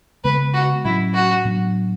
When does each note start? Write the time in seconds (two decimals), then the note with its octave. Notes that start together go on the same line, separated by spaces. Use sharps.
0.24 C#3 G#3 B3 B4
0.54 F#4
0.85 A2 F#3 C#4 E4
1.14 F#4
1.45 A2 F#3 B3 D4